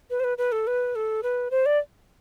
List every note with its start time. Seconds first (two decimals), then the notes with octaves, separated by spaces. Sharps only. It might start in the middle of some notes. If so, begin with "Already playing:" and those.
0.10 B4
0.20 C5
0.24 B4
0.38 B4
0.52 A4
0.67 B4
0.96 A4
1.23 B4
1.51 C5
1.66 D5